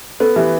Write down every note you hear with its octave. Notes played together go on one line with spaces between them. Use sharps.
B3 A4
E3 G4